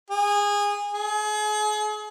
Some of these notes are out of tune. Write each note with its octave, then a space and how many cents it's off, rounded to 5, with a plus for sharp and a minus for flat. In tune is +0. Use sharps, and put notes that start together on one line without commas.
G#4 -20
G#4 +35